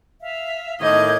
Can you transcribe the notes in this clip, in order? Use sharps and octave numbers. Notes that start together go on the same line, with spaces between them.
E5 F5
A2 D#3 D#5 D6 G6 G#6